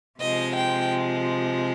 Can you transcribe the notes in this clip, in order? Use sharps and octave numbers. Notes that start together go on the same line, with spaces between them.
C3 F3 G#3 D#5
G5